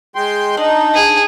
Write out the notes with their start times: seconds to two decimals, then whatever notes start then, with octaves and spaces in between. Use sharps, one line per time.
0.16 G#3 G5 C6
0.57 D4 D#4
0.94 G#4